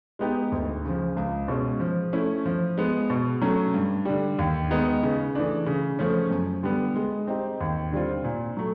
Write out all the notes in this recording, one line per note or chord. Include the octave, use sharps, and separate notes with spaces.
G#3 B3 D#4 G4
D2
C#3 F3
C#2
B2 G#3 C#4
F3
A3 C#4 E4
F3
G#3 B3
B2
F#3 A3 C#4
G2
D3 G3
D#2
D#3 G#3 B3 D#4
C#3
E3 A3 D4
C#3
F3 A3 C#4
F#2
D3 G3 B3
G#3
C4 D#4 G4
D#2
D3 G3 C4 F4
A#2
F#3 A3